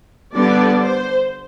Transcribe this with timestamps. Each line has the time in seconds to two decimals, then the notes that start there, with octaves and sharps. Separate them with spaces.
0.33 D3 G3 B3 D4 D5
0.79 C5